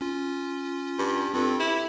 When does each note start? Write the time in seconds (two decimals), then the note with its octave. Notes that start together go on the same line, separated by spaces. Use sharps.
0.01 C#4 F4
0.99 G2
1.34 G2 C4 F4 A4
1.60 E4 G4